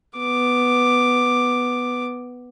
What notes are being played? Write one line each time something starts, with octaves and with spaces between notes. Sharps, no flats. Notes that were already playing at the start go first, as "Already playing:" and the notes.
B3 D6